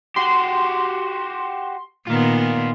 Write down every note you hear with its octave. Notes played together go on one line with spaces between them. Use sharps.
F#4 G4 C6
A#2 D#3 B3 F4 A#4